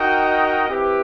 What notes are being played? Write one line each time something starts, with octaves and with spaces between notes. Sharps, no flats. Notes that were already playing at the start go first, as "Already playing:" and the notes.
Already playing: D#4 F#4 A#4 D#5 G5
C4 E4 G4 B4